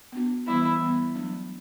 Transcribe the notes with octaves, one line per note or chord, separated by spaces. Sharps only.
B3 D4 F#4
E3 G3 B3 E4
E3 G3 B3
F#3 A3 D4